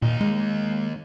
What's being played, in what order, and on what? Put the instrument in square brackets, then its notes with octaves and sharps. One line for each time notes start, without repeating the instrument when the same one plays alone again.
[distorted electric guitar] D#2 D#4 [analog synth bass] A#2
[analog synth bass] G#3